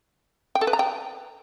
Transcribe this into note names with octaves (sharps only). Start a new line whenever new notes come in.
G5
A4
B4
A#5
G5